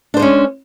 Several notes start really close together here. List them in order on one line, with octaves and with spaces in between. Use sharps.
D4 C5 G#3 C#4